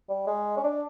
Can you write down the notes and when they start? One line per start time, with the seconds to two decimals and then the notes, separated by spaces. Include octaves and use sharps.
0.09 G3
0.27 G#3
0.57 C#4
0.63 D4